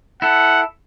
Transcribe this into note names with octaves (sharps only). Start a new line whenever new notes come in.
E4 A4 F#5